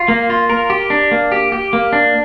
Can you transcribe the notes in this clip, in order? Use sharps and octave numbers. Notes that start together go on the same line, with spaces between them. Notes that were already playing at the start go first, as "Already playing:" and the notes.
Already playing: F4
A#3
F4
A#4
G4
D4
A#3
G4
G4
A#3
D4